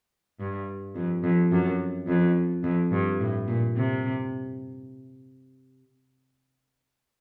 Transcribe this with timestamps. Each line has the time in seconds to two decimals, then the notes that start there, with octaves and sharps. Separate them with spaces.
0.40 G2
0.95 F2
1.24 F2
1.52 F#2
2.08 F2
2.64 F2
2.92 G2
3.20 A2
3.48 A#2
3.76 C3